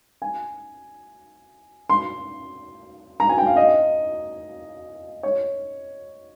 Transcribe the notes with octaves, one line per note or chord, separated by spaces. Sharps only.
G#5
C6
A#5
G#5
G5
F5
D#5
C#5